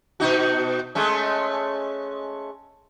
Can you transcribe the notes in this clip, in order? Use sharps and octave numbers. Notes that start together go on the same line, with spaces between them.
B2 D#4 F#4
G#3 A3 C#4